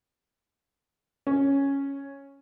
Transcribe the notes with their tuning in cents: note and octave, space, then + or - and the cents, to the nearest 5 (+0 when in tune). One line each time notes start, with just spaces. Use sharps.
C#4 -5